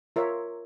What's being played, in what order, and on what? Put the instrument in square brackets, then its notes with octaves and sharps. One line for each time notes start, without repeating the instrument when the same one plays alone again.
[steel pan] F4 A#4 C#5 E5